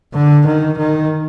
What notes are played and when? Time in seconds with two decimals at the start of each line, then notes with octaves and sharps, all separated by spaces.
0.14 D3
0.46 D#3
0.77 D#3